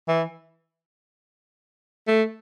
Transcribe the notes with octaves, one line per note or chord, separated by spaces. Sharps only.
E3
A3